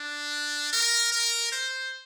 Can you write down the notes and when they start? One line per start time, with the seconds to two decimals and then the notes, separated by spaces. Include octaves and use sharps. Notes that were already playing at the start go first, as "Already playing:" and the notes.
Already playing: D4
0.73 A#4
1.12 A#4
1.52 C5